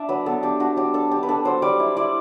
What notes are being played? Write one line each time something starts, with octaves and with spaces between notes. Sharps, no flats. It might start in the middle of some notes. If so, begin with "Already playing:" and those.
Already playing: D4 D5 E5
F#3 B4
B3 A4
D4 G4
D4 F#4
F#3 G4
D4 A4
D4 G4
B4
D4 A4
F#3 C5
G3 D5
E4
E4 D5